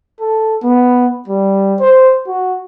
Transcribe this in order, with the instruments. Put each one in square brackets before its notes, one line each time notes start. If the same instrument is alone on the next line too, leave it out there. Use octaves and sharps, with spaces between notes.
[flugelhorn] A4
B3
G3
C5
F#4